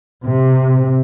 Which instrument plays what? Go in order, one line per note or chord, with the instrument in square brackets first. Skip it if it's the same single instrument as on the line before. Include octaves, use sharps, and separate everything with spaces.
[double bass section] C3